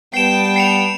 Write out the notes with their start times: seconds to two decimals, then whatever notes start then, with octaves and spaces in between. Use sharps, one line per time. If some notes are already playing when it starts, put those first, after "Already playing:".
0.14 G3 B3 G5 A5 C7 E7
0.56 C7 C#7 F7